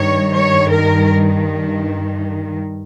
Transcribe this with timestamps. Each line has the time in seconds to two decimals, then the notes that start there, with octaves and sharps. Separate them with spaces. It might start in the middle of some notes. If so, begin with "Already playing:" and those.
Already playing: G2 D#3 C#5
0.35 C#5
0.72 A#4